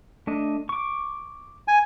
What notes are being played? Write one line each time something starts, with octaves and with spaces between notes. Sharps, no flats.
A3 D4 D#5
C#6 D6
G#5